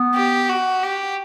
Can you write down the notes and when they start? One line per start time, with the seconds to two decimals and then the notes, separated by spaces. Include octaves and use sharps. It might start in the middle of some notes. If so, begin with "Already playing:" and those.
Already playing: B3
0.15 G4
0.49 F#4
0.83 G4